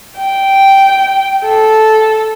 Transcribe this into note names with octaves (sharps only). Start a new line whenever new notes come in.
G5
A4